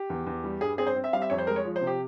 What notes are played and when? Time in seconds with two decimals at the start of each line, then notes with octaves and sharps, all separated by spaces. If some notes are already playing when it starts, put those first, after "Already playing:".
Already playing: G4
0.10 E2
0.26 E2
0.44 G3
0.61 G2 G#4
0.78 C4 G#4
0.87 C5
0.96 C4
1.04 E5
1.13 G3 F5
1.22 E5
1.30 F2 C#5
1.38 C5
1.47 G#3 A#4
1.56 C#5
1.65 F3
1.76 C5
1.81 C3
1.87 G4